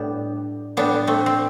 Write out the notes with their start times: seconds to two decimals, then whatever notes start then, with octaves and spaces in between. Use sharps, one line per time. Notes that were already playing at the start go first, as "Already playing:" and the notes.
Already playing: A2 G3 B3 D4
0.77 A2 G3 B3 D4
1.07 A3 C4
1.26 C4